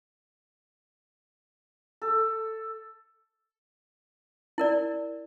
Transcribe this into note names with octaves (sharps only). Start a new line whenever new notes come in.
A4
E4 A#4 D5